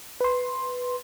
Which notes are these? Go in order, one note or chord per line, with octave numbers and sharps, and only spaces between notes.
B4 C6